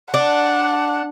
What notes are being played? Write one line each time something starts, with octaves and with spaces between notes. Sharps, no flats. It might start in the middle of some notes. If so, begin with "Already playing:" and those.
D4 F#5